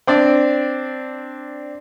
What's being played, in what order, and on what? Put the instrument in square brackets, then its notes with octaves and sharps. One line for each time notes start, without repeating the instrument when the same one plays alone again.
[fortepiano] C4 D4 D5